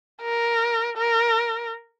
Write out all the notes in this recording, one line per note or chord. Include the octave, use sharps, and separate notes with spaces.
A#4
A#4